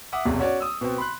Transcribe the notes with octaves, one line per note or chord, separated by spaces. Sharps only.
E5 F#5 D6 D#6
E1 B1 E2 C3
C#4 F#4 C#5 D5
D#6 E6
B2 B3 C4
B5 C6 F#6